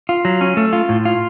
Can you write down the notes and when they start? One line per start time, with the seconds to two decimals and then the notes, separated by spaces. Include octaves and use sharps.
0.09 F4
0.25 F#3
0.41 C#4
0.57 A3
0.73 F4
0.89 A2
1.05 F4